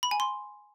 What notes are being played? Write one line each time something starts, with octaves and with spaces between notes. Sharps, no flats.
B5
G#5
C6